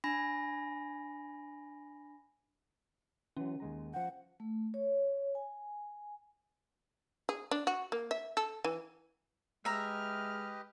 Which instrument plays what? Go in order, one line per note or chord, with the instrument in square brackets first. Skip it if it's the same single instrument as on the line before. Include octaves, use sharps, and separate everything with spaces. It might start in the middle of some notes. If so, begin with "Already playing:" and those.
[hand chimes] D4 G#5 B5 A#6
[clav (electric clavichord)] E3 F#3 [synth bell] C#4
[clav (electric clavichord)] D#2 G#3 A#5
[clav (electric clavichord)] F3 G5 [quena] F#5
[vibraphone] A3
C#5
G#5
[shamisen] G#4
D4
F#4
A#3
E5
A4
E3
[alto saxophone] G#3 [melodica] G4 B4 D#5 [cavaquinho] E5 A#5 [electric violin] F6